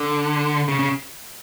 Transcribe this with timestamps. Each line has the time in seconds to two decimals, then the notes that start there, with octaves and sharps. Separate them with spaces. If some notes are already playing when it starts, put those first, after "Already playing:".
Already playing: D3
0.68 C#3
0.79 C#3